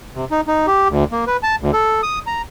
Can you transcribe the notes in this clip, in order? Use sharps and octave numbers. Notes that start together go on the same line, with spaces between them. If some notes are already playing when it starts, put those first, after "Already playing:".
C3
D#4
D#4
G4
D2
A#3
B4
A5
D2
A4
D#6
A#5